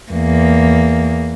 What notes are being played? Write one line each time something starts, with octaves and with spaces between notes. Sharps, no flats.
E2 A#3